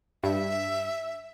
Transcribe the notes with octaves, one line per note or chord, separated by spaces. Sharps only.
G2 E5